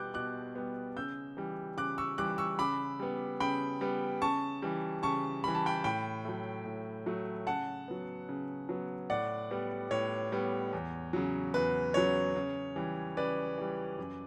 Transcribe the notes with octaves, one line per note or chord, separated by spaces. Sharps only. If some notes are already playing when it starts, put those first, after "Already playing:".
Already playing: B2 G3 B3 D6 F#6 G6
B2 D6 F#6
G3 B3
C#3 E6 G6
E3 G3
C#3 D6 F#6
C#6 E6
E3 G3 D6 F#6
C#6 E6
C#3 B5 D6
G3 B3
C#3 G5 B5
G3 B3
C#3 A5 C#6
E3 G3
C#3 A5 C#6
E3 G3 B5
A5
G5 B5
A2 G5 B5
F#3 A3
A2
F#3 A3
C#3 F#5 A5
F#3 B3
C#3
F#3 B3
A2 D5 F#5
G3 B3
A2 C#5
G3 B3
E2
C#3 F#3
E2 B4
C#3 F#3 C#5
C#3
E3 G3
C#3 B4 D5
E3 G3
F#2